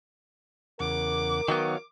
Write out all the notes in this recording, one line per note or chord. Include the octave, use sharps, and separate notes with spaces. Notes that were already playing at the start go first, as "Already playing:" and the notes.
E2 C#3 A#4 F#5 D6
D#3 F#3 B3 F#4 C#5 F5